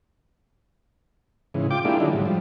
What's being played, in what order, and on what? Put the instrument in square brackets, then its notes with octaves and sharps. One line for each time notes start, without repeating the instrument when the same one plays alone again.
[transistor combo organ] G#2 C#3 E3
F4 G5 D6
G#3 A#3 D4 E4 F4 G4
D3 D#3 F#3 G#3 D4 E4
G#2 F#3 G3
F3 G3